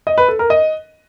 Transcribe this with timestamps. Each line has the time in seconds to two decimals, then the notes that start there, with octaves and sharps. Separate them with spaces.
0.07 D#5
0.18 B4
0.28 A4
0.39 A#4
0.50 D#5